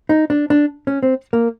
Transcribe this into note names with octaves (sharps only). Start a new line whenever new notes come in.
D#4
D4
D4
C#4
C4
A#3